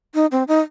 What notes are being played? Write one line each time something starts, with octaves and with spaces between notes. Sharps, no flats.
D#4
C4
D#4